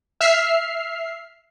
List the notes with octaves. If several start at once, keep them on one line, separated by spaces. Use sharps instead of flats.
E5 F6 C7